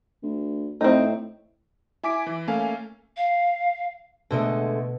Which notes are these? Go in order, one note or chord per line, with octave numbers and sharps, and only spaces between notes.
D2
A2 C4 D#4
E4 G#5 D6 B6 D7
E3
A3 A#3 C#4 F5 G#5
F5
B2 D3 G#3 A3